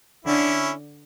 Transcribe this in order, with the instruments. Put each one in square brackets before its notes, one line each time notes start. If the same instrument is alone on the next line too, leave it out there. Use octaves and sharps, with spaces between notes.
[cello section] D3 [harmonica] C#4 E4